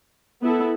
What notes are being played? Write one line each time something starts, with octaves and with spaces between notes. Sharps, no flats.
B3 E4 A4